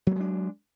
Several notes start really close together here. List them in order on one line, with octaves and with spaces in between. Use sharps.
F#3 A#3 G#3 D4